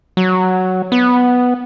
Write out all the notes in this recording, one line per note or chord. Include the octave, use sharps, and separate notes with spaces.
F#3
B3